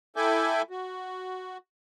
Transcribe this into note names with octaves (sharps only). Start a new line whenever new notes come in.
E4 A4 E5 G5 G#5 D6
F#4